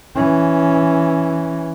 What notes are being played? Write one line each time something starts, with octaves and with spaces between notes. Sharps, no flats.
E3 C#4